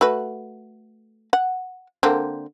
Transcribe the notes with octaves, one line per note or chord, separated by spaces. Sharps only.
A3 F#4 B4
F#5
D3 A#3 C4